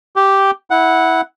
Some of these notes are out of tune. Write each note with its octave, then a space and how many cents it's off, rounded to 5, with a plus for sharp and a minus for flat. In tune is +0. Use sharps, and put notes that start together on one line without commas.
G4 -5 G5 -5
E4 -15 F#5 +0